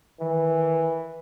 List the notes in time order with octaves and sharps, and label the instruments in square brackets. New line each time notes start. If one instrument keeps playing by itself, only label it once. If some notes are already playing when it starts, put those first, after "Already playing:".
[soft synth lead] D#3 [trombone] E3